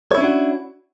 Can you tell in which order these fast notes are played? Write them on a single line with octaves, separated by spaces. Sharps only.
C#5 E4 C#4 D4 F#4